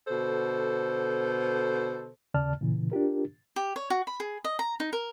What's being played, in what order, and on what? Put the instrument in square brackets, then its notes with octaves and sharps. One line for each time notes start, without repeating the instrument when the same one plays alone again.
[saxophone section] B2 D3 A4 C5
[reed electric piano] D#2 C#3 D5 A5 F6
A#2 C#3 E3
D4 F4 G4 A#4
[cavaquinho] G4
C#5
F#4
B5
G#4
D#5
A#5
D#4
A#4